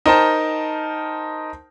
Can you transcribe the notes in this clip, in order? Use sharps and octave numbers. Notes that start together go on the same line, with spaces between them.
D#4 A#4 C5 G5 A5